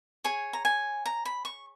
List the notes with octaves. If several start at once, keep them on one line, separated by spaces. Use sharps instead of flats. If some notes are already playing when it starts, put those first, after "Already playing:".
G#4 C#5 G#5
A#5
G#5
A#5
B5
C#6